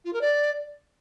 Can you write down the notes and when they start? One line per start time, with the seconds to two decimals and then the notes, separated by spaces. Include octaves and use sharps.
0.05 F4
0.13 A#4
0.21 D5